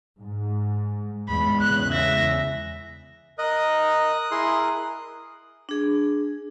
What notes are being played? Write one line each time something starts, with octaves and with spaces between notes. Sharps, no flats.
G#2
E2 G#2 G#3 B5
E2 C#3 G#3 F#6
E5 A#6
A#4 D#5 D#6 F#6
E4 G#4 C6
D4 G#4